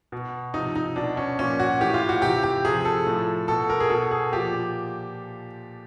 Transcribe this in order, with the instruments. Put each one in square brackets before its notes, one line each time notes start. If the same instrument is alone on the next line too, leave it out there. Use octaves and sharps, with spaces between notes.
[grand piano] B2
C3 F3 D#4
D#4
B2 D4
C#4
A#2 F3 C#4
F#4
A2 E3 G4
F4
F#4
C3 E3 G4
G4
C3 F3 G#4
A4
A2 F3
B2 A4
A#4
G#4
B2 A4
G#4
A#2 F3 G4